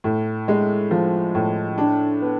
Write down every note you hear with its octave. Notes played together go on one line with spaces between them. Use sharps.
A2
G#3
F3
A2
D4
B3